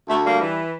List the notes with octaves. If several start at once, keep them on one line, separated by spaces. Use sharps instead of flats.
D2 A3
G3 A#3
E3